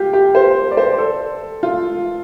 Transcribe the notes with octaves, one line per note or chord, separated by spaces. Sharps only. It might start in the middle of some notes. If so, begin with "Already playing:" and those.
Already playing: F4 G4
G4
C5
D5
C5
A4
F4